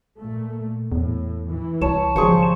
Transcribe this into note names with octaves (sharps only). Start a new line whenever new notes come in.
A#2 A3
E2 A2
E3
C2 C#5 A5
G#1 C#3 F3 G3 G#4 C5 C#6